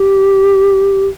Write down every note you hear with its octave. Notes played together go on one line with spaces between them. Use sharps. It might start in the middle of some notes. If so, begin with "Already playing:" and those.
Already playing: G4